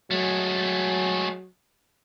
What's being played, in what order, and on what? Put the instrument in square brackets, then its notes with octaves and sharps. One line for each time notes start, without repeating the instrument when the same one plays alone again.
[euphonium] F#3 [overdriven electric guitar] G#3 A3